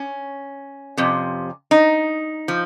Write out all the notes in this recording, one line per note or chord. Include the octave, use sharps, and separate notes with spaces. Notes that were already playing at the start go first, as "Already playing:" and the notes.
Already playing: C#4
F2 C3
D#4
F3